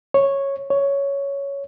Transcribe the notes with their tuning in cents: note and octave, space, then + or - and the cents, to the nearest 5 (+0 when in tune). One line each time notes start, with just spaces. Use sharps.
C#5 -5
C#5 +10